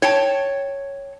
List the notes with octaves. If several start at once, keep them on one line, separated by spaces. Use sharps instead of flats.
C#5 G5 A5